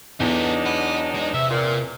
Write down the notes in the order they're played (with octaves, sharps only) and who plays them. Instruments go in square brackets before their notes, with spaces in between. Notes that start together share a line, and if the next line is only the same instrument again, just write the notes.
[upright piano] E2 [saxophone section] F#3 D4 D#4 [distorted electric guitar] B3 A4
[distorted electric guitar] F#5 B5
G#3
[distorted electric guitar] C3 [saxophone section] E5
[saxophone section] A#2